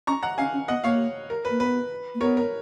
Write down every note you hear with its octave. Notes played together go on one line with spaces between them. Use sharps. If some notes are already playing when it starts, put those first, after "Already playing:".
C#4 A#5 C#6
F#5 A#5
C#4 F5 G#5
C#4
B3 D#5 F#5
A#3 C#5 F5
A#4
B4
A#3
B3 B4
A#3
B3 A#4 C#5
A#4